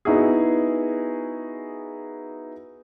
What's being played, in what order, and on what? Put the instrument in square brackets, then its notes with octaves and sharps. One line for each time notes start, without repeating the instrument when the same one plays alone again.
[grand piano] B3 D#4 E4 F#4 G#4